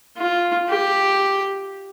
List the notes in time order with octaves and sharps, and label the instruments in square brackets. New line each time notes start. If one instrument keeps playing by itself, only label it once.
[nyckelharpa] F4
G4